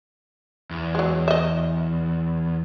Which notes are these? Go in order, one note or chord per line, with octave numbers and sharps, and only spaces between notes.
E2
F#3 G#3
D#5 E5